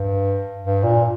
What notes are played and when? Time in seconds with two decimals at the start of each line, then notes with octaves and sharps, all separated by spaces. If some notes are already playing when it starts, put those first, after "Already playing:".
Already playing: G2
0.62 G2
0.83 A#2